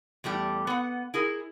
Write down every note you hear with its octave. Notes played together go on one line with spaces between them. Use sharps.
E2 G3 A3 G4
B3 F#5
E4 G#4 A#4